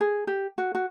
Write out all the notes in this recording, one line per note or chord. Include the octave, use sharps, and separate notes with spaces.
G#4
G4
F#4
F#4